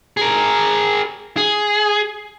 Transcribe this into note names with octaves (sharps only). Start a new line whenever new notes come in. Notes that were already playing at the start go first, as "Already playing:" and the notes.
G#4 A#4
G#4